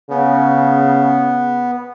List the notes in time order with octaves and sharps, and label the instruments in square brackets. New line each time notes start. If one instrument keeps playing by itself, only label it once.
[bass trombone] C#3 [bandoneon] B3